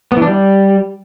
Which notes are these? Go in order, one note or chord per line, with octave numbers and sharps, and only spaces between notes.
B3
E3
D4
G3